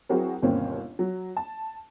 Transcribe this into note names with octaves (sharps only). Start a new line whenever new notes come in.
F#3 C4 E4 F#4 G#4 A#4
G1 D#2 B2 A#3 C4 C#4
F#3
A5